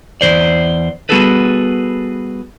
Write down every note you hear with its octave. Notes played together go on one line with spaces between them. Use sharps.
E2 C#3 C5 D5
G3 B3 F#4 G#4 A4 B4